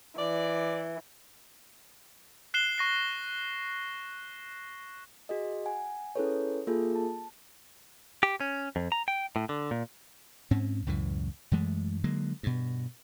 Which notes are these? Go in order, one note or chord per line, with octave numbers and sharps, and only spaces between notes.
E3 D5
F#6 C7 E7 G7
C#6 A#6 C7
F#4 G#4 D#5
F#5 G#5
C#4 E4 G#4 A4 B4 C#5
A#3 F4 G#4 A4
A5
G4
C#4
F2
A#5
G5
A2
D3
A#2
G#2 C4 C#4
C#2 F#2 A2 E3
F#2 E3 G#3 A3
D3 F#3 G#3 A#3
G2 B2